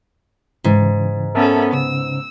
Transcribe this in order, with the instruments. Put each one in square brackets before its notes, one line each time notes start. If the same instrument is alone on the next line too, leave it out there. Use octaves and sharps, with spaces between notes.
[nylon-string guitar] G#2 [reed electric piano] C#3 E3
[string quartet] B3 C#4 A4 [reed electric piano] A#4 E5 A5
[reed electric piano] C#3 [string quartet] E6